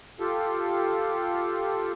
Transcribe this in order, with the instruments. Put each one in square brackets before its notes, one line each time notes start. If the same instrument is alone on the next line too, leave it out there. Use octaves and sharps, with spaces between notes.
[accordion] F4 G4 A4